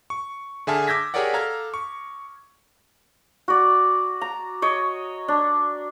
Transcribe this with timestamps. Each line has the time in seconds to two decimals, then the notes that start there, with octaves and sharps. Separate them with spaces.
0.10 C#6
0.67 D3 G#4 E5 G#5 A5 F6
0.87 D6 E6 G6 G#6 A#6 B6
1.14 G4 G#4 A#4 C#5 D5 F#5
1.33 A4 F5 A#5 F6 G#6
1.74 C#6
3.48 F#4 D5
4.21 A#5
4.62 C#5 D#5
5.28 D4